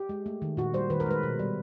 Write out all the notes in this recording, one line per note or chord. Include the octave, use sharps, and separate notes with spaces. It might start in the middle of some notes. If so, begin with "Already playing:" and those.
Already playing: G4
G#3
A3
D#3
A#2 F#4
G3 C5
D#3 B4
A#4
G#3 B4
B2
G3